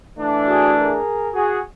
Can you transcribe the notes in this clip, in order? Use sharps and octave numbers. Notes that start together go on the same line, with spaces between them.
E3 A3 D4
F#4 G#4
G#4 A#4
F#4 G#4